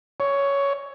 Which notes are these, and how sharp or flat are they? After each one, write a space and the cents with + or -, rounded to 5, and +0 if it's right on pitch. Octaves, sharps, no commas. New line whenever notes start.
C#5 +10